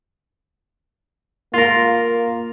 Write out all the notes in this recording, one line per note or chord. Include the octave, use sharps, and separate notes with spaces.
A#3 F4 A#4